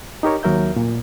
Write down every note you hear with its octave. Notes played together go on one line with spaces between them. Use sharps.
D#4 G4 A#4 C#5
D#2 F#3 A#4 E5 G6
A#2